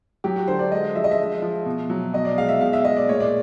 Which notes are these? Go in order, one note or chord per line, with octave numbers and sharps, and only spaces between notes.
F#3 G4
F#4
D3 C5
D5
G#3 D#5
F3 E5
D#5
E5
G#3
F3
B2
F#3
B2 D#5
D5
G#3 F5
E5
B2 F5
E5
G#3 D#5
D5
A#2 C#5
D5